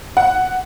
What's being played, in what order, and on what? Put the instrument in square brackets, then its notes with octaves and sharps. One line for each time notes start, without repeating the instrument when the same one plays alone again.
[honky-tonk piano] F#5